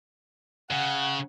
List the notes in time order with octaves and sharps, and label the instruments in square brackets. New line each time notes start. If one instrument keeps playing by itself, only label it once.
[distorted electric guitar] C#3 [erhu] F#5